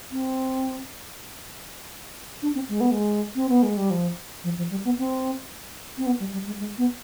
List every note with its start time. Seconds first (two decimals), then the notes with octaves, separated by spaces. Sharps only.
0.12 C4
2.42 D4
2.54 C4
2.69 G#3
2.80 B3
2.91 G#3
3.35 C4
3.49 B3
3.63 G#3
3.77 G3
3.90 F3
4.44 F3
4.58 F3
4.70 G3
4.85 B3
4.98 C4
5.97 C4
6.06 B3
6.19 G3
6.33 G3
6.46 G#3
6.60 G#3
6.78 B3